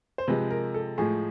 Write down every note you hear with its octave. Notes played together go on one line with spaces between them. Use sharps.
C5
C3 F3 G#3 B4
A#4
A4
A2 F3 G#3 G#4